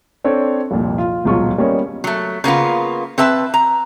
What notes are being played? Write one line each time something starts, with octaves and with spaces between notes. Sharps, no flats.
C4 D4 A4 C5 C#5
C2 F2 A#2
F4
D#1 C#2 B2 F#3 F4 C#6
G3 A#3 B3 C#4 C#5 D#5
F#3 A3
C#3 A#3 B3 F4
C4 B4 E5 A5
A#5